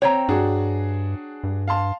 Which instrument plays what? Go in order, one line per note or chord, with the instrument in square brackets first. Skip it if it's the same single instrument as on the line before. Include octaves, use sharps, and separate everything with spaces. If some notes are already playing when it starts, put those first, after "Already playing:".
[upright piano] C4 [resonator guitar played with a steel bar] C#5 G5 A#5
[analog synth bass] G2 [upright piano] D4 F#4 G#4
[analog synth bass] G2
[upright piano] F5 A5 C6